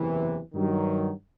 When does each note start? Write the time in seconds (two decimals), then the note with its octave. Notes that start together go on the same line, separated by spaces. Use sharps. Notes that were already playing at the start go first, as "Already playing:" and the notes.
Already playing: F#1 E2 C3 E3
0.54 G2 D#3 F#3